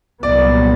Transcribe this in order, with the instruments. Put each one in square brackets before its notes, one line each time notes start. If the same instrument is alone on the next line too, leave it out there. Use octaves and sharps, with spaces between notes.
[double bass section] C2 A#2 F#3 B3 [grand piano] D5